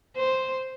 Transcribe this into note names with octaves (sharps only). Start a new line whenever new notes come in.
C5